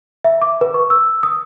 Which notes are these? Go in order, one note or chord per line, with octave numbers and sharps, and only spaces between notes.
E5
D6
B4
C#6
E6
D#6